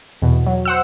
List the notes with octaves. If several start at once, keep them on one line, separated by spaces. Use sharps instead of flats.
E2 B2
F#3
C5 F#5 E6